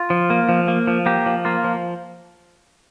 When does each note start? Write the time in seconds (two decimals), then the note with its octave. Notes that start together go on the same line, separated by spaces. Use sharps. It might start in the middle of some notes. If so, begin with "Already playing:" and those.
Already playing: F4
0.10 F3
0.30 A#3
0.49 F3
0.68 A#3
0.87 F3
1.06 A#3 G4
1.26 F3
1.45 A#3 F4
1.64 F3